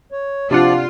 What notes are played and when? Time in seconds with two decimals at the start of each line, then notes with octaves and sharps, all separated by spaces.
0.12 C#5
0.51 C3 F3 D4 F4 D5 F#5